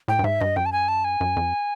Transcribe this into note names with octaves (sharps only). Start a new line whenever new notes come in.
A2 G5
G2
G#2 E5
G2 D#5
F#2 G5
A5
G#5
A5
G#5
F#2
F2